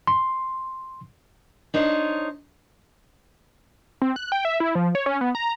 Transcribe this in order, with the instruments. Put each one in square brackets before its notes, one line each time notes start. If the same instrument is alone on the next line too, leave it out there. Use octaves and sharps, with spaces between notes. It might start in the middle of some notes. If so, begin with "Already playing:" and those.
[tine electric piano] C6
[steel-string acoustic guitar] D4 D#4 C5 C#5
[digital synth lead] C4
F#6
G5
E5
E4
F3
C#5
C#4
B3
A#5